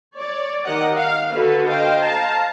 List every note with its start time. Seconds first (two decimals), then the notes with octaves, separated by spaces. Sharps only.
0.16 C#5 D5
0.64 D#3 G4 A#4 D#5 F#5
0.95 F5
1.32 D3 F#4 A4 B4
1.66 C5 D#5 F5 G5
2.01 F5 A5 A#5